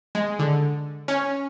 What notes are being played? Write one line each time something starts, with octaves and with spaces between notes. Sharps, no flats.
G#3
D3
C#4